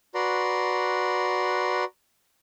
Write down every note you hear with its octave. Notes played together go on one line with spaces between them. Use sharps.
F#4 B4 D5 A#5 C6